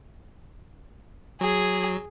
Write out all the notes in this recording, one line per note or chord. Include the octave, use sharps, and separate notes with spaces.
F#3 G#4